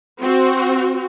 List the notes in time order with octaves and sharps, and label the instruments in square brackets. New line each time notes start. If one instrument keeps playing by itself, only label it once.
[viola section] C4 F#4